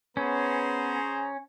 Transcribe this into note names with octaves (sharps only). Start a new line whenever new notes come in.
B3 C#4 G#4 B4 C5 A#5